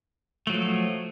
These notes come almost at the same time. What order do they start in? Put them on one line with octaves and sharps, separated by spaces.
A3 F#3 F3